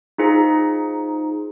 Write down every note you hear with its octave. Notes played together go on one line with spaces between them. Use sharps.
D#4 F4 G#4 C5 A#5